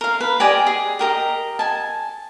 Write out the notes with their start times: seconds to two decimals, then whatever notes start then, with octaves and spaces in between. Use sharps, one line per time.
0.01 A#4 F5
0.21 B4
0.40 G4 D5 D#5 G#5
0.67 G#4
0.99 G4 A#4 D#5
1.59 G#5 A5